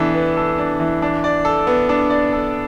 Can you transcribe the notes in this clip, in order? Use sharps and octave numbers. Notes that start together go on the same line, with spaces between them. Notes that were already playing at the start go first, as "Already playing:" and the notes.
Already playing: E3 B3 D4 A4
B3
A4
D4
E3
D4
D5
A4
B3
D4
D5
A4